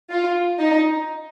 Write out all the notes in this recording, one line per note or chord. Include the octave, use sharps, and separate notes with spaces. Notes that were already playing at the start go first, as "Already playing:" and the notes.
F4
D#4